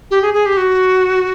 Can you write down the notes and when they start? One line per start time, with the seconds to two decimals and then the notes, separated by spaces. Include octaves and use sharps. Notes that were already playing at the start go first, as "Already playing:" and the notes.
0.11 G4
0.22 G#4
0.34 G#4
0.46 G4
0.57 F#4